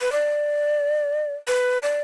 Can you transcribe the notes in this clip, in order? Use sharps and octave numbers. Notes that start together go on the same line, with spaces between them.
B4
D5
B4
D5